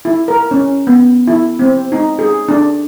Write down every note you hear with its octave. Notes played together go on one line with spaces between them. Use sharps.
E4
A#4
C#4
B3
E4
C4
D#4
G#4
D4